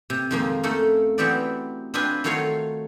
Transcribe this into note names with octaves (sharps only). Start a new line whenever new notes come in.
C3
F2 D#3 F3 G#3 A#3
A3 A#3 C#4 D#4 A4
E3 F#3 B3 C4 G4 D5
C4 D4 F4 B4 D#5 G#5
D#3 F#3 A3 F4 C#5 F5